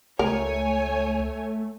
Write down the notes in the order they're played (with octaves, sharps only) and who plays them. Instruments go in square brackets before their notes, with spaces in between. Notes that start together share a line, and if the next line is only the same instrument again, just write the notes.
[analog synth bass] C#2 [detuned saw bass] A3 [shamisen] A#4 [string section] C#5 G#5